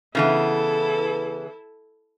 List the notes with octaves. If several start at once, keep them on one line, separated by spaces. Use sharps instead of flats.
C#3 E3 B3 E4 A4